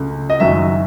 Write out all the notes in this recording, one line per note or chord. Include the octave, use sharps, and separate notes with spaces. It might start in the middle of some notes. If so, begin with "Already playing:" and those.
Already playing: C#2 C#3 F#3 A3
D#5
F#1 F#2 D#3 F#3 E5